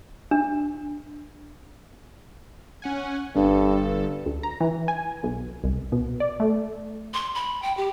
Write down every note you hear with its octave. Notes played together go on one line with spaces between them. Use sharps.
D4
C#4 F#5 G#5
G1 G2 D4 A4
D2
A#5
E3
G#5
B1
C2
B2
D5
A3
C6
B5
G5
G4